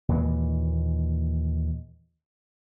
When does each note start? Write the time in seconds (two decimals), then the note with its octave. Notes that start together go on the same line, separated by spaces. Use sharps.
0.08 D#2 A#2 E3 G#3